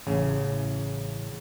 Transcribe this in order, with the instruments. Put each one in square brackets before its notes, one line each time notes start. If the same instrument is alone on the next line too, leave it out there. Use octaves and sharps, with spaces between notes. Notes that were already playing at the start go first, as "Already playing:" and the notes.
[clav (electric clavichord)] A1 C#3